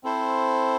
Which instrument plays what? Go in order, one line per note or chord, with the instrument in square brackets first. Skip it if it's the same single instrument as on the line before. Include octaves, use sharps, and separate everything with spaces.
[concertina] C4 E4 A4 C5